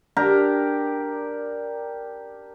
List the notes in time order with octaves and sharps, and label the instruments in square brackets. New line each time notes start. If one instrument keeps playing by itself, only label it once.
[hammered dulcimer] D4 G4 A#4 A#5